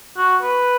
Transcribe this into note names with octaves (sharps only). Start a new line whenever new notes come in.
F#4
B4